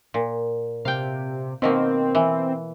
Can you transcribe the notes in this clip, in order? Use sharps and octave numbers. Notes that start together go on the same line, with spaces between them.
A#2
C3 F5 G5
B2 D#3 A#3 C4
E3